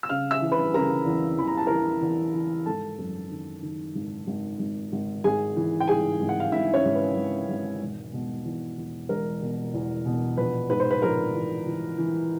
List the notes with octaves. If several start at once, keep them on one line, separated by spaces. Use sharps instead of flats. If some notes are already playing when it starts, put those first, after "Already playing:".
E6
C#3 F5 F6
E5 E6
E3
B4 B5
C#3 A#4 A#5
E2
E2 B5
A#5
A5
E3 A#4 A#5
E2
E3
G#1 A4 A5
F#2
D#3
D#3
G#1
G#1
G#1
G#1
G#1 G#4 G#5
E3
G5
G#2 G#4 G#5
G#1
F#5
F5
G#2 E4 E5
C#4 C#5
G#1
B4
G#1
G#1
E1
B2
E2
E2
E1 A#4
B2
E2
B2
A#1 B4
G#2 B4
C5
B4
A#1 A#4
E3
E3
E3